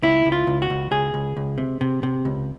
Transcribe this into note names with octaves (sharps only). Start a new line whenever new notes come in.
C#2 E4
C#2
F4
C#2
F#4
C#2
C#2 G#4
C#2
C#2
C3
C3
C3
C#2